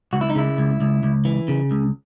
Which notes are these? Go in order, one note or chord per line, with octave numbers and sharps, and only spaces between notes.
C#2 F#4
E4
D#4
C#3 E4
C#2
C#2
C#2
E3
C#3
C#2